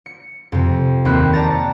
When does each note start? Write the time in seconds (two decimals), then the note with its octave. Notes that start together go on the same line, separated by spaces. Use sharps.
0.06 C#7
0.52 F2 C3
1.05 D#2 C4 B5 F#6
1.32 D5 A5 A#5 A6 C#7